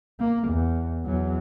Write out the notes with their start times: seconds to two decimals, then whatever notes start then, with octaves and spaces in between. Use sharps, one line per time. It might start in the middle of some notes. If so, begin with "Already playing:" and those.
0.19 A#3
0.48 E2
1.04 E2 F#3